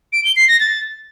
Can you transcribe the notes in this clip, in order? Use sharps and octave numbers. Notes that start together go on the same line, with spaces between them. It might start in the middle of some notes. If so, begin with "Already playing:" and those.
D7
G7
C7
A#6
A6